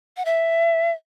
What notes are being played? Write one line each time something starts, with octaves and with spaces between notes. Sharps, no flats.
F#5
E5